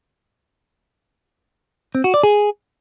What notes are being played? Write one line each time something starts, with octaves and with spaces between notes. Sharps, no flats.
C4
F#4
D5
G#4